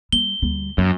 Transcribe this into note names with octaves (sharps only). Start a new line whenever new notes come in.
G3 G7
D2 G3
F#2 F#3